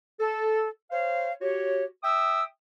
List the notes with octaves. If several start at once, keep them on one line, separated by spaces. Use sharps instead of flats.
A4
C5 C#5 F5
F#4 G4 C#5
E5 G5 D#6 E6